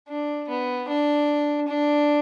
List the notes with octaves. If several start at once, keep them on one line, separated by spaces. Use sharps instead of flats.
D4
B3
D4
D4